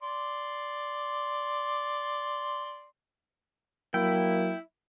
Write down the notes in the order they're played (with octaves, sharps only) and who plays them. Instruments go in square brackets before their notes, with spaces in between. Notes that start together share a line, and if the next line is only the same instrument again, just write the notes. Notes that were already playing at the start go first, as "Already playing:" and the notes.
[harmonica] D5 C6
[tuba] F#3 [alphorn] A#3 [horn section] E4 [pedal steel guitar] G5